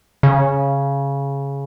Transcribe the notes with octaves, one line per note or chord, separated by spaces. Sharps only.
C#3